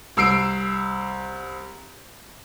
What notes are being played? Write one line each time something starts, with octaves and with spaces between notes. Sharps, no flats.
C2 E6 C7 D7